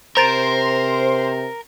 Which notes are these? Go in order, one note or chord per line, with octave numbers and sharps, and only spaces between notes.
C3 A#4 C5 A#5 A6 D7